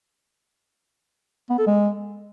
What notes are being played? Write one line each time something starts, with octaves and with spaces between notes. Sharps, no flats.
B3
A4
G#3